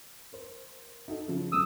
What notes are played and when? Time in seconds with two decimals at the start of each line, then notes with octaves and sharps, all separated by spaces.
0.33 A#4 C5
1.08 D#4 F#4 A4
1.28 C#3 E3 F3
1.52 F#2 D3 D#6 E6